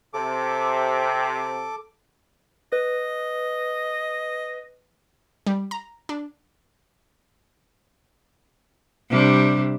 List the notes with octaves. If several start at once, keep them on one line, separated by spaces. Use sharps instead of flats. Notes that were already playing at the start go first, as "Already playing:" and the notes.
C3 A4 D6
B4 D#5
G3
A#5
D4
C3 G3 D4